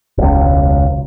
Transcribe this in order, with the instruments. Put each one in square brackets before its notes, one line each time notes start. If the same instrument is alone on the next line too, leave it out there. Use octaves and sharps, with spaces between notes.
[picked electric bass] E1 C#2